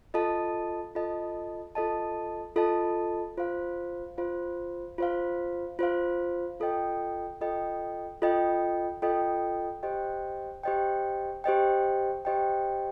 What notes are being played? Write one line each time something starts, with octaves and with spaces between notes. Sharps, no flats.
F4 A4 D#5 A5
F4 A4 D#5 A5
F4 A4 D#5 A5
F4 A4 D#5 A5
F4 C5 F5
F4 C5 F5
F4 C5 F5
F4 C5 F5
F4 A4 D#5 G5
F4 A4 D#5 G5
F4 A4 D#5 G5
F4 A4 D#5 G5
G4 C5 D#5 G5
G4 C5 D#5 G5
G4 C5 D#5 G5
G4 C5 D#5 G5